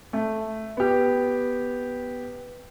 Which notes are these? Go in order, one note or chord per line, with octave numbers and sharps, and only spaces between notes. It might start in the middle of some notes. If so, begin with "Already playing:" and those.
A3
B3 G4